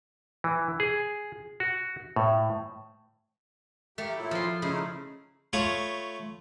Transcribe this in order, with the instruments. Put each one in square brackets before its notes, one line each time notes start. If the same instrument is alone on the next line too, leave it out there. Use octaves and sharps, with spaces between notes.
[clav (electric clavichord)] E3
G#4
F#4
A2
[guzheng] A3 [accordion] A#3 G4
[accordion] A#2 F#3 E4
[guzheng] F3 C6
[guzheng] C#3 [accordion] A3 D#4 E4
[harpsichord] A3 F4 C#5 B5 D#6